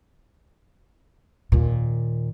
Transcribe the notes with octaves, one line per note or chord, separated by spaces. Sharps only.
D#2 A#2